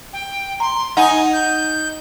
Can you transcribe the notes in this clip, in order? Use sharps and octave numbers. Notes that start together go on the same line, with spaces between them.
G5
A#5 C6
D#4 F#5 G#5
G6